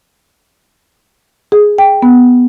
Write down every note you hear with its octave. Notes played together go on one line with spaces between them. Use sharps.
G#4
G5
B3